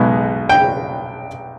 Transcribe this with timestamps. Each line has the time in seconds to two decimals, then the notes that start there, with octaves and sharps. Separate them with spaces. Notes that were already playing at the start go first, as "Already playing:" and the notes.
Already playing: B1 B2 G#3 B3
0.49 G5